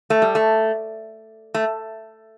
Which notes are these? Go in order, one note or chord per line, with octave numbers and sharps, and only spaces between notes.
A3
G3
A3
A3